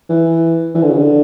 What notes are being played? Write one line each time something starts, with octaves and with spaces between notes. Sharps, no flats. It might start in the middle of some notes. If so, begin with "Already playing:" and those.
E3
E3
D3
C#3
D3